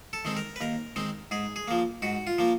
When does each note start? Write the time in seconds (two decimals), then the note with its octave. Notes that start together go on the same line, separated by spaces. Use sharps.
0.13 A4
0.25 D#3 G#3 C4
0.37 A#4
0.56 B4
0.61 D#2 A#4
0.96 D#3 G#3 C4
1.31 G#2 G#4
1.56 G#4
1.68 F3 A#3
2.02 G#2 F#4
2.27 F4
2.39 F3 A#3